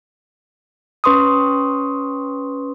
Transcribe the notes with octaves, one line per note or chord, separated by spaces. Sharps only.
C#4 B4 C6 C#6 D#6